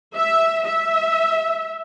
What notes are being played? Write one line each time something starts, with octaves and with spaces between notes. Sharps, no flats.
E5
E5